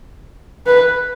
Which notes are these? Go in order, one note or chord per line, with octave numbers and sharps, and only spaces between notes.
B4